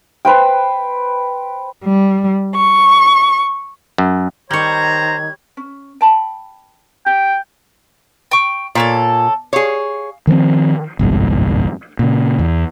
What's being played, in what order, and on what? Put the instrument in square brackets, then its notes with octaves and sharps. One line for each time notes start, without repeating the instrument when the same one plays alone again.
[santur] B4 C5 G5
[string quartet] G3
C#6
[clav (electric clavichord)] F#2
[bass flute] D#3 [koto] G3 C#5 [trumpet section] C5 A#5 [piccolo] G#6
[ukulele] C#4
G5 A5 B5
[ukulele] G4 [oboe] G5
[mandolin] G5 C#6
[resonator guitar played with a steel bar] A#2 [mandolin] A4 C#5 D5
[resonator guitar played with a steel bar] G#4 C#5 [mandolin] F5
[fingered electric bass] D#3 F3 A#3 C4
G1 C2 F2 G#2
A#2 C#3
E2